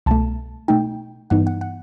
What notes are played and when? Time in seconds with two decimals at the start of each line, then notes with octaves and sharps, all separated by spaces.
0.06 C2 B2 A3 A5
0.68 B2 A3 D#4 G5
1.30 G2 E3 B3 D#4 F#5
1.47 F#5
1.61 F#5